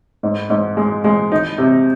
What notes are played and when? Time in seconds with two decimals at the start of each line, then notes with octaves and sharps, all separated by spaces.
0.23 G#2
0.50 G#2
0.77 G#3
1.04 G#3
1.32 D#4
1.58 C3